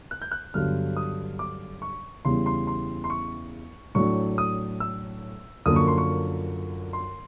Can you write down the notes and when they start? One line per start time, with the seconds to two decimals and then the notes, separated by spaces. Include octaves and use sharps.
0.11 F#6
0.22 G6
0.31 F#6
0.54 G2 D3 F#3 B3 F6
0.97 D#6
1.39 D6
1.82 C#6
2.25 E2 C#3 E3 G3 C6
2.46 C6
2.67 C6
3.04 C6
3.10 C#6
3.95 A2 F#3 A3 D4 C#6
4.38 D#6
4.80 E6
5.66 F#2 D3 F3 A#3 D#6
5.76 C#6
5.88 C6
5.98 C#6
6.93 C6